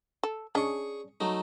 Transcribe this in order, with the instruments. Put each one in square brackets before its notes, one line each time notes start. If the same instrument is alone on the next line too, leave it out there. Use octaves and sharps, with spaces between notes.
[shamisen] A4
[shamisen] C#4 D4 D#5 [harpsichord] G#4 C#6
[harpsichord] F#3 A3 D#4